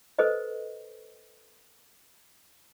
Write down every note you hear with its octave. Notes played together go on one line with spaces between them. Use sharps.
A4 B4 C5 D#5